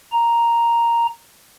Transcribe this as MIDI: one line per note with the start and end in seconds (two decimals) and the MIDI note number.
0.13 1.07 82